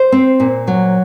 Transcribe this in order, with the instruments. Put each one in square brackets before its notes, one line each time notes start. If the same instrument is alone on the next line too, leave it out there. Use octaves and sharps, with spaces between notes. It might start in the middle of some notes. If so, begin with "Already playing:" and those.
Already playing: [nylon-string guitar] C5
C4
A#2
F#3